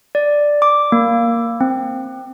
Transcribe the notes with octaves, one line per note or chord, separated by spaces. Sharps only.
D5
D6
A#3
C4